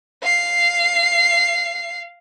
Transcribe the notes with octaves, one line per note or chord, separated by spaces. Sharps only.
F5 C7